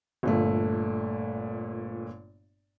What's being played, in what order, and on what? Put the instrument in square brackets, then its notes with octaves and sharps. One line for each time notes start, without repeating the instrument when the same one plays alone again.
[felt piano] G1 A#2 A3